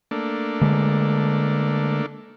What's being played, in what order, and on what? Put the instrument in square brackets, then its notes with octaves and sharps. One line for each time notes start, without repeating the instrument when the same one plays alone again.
[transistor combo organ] A3 A#3 D4
[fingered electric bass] D3 G#3